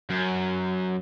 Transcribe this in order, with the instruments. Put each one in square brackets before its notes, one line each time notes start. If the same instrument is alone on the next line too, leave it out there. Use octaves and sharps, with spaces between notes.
[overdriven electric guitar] F#2